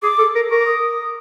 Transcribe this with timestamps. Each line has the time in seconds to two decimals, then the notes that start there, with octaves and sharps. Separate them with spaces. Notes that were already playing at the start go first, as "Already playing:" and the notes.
0.03 G#4 D6
0.19 A4
0.35 A#4
0.51 A#4 C#6
0.59 D6
0.66 D#6